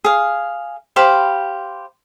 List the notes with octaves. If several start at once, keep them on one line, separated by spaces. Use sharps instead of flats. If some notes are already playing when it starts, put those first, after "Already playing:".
G#4 F5
G4 C5 F5 B5